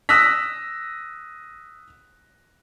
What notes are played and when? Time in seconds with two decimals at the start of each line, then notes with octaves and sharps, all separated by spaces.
0.09 D#6 E6 F#6 A#6 B6